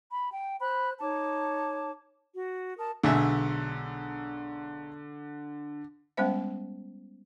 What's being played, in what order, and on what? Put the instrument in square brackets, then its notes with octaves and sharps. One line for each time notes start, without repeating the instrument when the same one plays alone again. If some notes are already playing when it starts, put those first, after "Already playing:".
[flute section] B5
G5
C5 B5 F#6
D#4 C#5 A5 D6
F#4
A#4 A5 D#6
[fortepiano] B1 G#3 E5 [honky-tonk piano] D3
[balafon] G3 G#3 B3 C#4 C5 E5